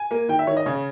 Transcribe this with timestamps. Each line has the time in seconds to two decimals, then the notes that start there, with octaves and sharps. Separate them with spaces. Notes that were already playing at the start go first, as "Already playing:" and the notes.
Already playing: G#5
0.11 A#3
0.29 D#3 G5
0.39 E5
0.47 D#3 C#5
0.56 D#5
0.66 C#3 C#5